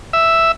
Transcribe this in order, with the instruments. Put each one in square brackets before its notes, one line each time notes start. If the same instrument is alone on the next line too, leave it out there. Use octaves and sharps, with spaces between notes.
[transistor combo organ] E5